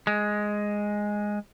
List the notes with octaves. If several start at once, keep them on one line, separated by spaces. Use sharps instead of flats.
G#3